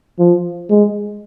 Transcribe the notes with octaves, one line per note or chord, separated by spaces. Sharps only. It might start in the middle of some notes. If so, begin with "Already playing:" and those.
F3
G#3